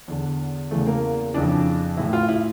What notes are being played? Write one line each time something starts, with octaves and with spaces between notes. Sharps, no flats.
E2 D3
E2 C#3 E3 A3
A#3
F2 C#3 E3 D4
A2 E3 E4
F4
E4